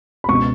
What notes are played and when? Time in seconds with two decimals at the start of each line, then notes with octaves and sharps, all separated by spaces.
0.24 B5
0.29 C#2 B2 C#6